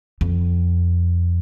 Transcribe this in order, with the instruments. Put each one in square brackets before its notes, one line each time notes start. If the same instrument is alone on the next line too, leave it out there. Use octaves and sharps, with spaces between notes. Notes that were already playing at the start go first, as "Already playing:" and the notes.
[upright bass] F2